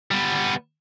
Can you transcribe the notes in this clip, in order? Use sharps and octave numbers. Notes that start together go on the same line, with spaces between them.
G3 B3